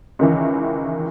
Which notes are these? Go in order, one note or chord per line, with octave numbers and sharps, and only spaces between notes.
C#2 D#3 E3